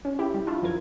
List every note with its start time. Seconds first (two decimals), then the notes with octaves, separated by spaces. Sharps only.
0.05 C#4
0.19 E4 G4
0.34 G3
0.47 D4 E4 F4
0.62 F#2 F3 F4 A#4 G#6